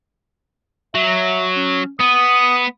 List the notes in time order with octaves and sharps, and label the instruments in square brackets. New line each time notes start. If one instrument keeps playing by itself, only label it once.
[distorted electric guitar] F#3 [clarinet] E5
[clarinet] C#4
[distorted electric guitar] B3 [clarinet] D#6